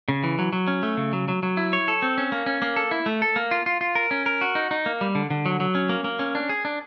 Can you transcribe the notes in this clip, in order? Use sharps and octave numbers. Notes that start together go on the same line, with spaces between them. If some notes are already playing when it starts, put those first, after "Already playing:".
C#3
E3
F#3
F#3
C#4
A3
C#3
F#3
F#3
F#3
E4
C#5
A4
C4
C#4
A#3
C#4
A#3
A4
E4
A3
A4
A#3
F4
F4
F4
A#4
C#4
A#4
F#4
D#4
D#4
A#3
G3
D3
D3
F#3
F#3
C#4
A#3
A#3
C#4
D4
G#4
D4